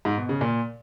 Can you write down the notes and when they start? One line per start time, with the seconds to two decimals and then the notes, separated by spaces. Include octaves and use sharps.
0.05 G#2
0.17 B2
0.29 C#3
0.41 A#2